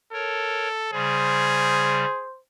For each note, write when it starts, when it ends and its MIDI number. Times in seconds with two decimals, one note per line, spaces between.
0.13 0.89 69
0.13 0.68 70
0.13 0.68 73
0.93 2.05 49
0.93 2.05 55
0.93 2.29 68
0.93 2.39 72